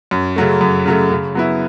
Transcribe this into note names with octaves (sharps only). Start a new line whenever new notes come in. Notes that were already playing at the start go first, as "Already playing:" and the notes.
F#2
C#3 F#3 A3
F#2
C#3 F#3 A3
C#3
F#3 B3 E4